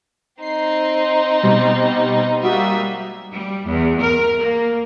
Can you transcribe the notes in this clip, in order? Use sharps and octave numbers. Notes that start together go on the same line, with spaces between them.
C4 D#4 C7
B2 G3
G3 A#3 F#4 E5 D#6
G3
E2
A#4
A#3